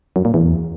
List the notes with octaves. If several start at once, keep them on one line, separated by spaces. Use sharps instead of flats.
F#2
A#2
E2